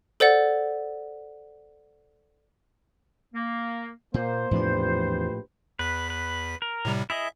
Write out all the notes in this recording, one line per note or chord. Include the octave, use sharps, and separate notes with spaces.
A4 C5 D5 F#5
A#3
A#2 A#3 C5
A#1 E2 A2 C3 F3 D4 G4 B4
E2 B4 B6
B4
A#4
A2 C3 G3
E4 G#4 D#5 E5